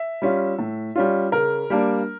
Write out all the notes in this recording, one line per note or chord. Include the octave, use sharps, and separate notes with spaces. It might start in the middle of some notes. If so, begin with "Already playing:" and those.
Already playing: E5
G3 C#4 F4
A2
G3 C#4 F4
C#3 A#4
G3 A#3 D4